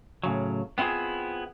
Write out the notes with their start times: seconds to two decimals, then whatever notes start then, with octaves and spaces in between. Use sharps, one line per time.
0.23 A2 C#3 F#3
0.78 B3 C4 E4 F4 G#4